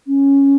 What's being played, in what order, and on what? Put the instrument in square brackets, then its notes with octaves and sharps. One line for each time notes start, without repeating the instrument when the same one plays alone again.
[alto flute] C#4